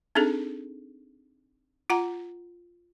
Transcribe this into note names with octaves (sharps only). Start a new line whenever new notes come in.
C4 D4 D#4 G#4 A4
F4 F#5 A#5